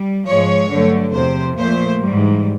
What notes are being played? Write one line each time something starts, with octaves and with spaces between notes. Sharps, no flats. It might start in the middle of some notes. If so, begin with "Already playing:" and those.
Already playing: G3
G#2 F3 G#3 C#5
G2 D3 F#3 A3
E2 C3 F3 C5
A#2 F3 A3 C5
G#2 E3 G3